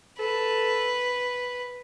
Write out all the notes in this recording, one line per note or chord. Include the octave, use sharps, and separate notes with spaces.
A4 B4